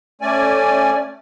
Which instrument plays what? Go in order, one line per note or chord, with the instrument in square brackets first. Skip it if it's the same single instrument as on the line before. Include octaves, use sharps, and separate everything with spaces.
[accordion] A3 C#4 D5 G#5